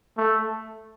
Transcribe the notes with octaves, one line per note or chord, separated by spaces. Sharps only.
A3